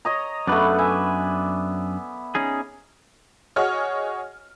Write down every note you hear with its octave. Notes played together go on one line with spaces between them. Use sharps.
C#5 D#5 A#5
F#2 A3 B3 D4 B4 D5
E5 G#5
C#4 D#4 G#4
F#4 G#4 C#5 D#5 F6